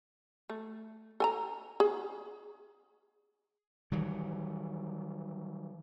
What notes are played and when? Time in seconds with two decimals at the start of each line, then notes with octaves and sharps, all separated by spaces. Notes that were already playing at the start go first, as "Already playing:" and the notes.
0.50 A3
1.20 A4 G#5 A#5
1.80 G#4
3.92 D#3 E3 F#3 G3